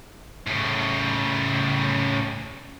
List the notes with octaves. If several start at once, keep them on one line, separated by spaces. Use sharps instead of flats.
A2 C#3